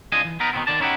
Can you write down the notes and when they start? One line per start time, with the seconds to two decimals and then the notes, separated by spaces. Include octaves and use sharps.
0.12 C2 D4 F4 D#5 G#5
0.25 E3
0.40 B3 D#4 A#4 B4
0.53 B2 D#3 F3 A3 B3 C4
0.67 D3 D#3 D5 A5
0.80 C#4 D#4 E4 G4 F#5